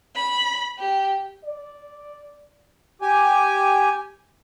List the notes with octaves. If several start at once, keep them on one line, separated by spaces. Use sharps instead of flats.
B5
G4
D5
G4 G#5